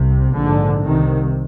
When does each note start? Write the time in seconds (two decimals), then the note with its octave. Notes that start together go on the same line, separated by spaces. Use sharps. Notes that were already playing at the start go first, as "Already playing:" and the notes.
Already playing: C2 C3
0.33 A#1 G#2 D3
0.83 C2 C3 D#3